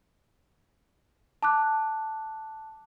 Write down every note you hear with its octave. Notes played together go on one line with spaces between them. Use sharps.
A5 D6 F#6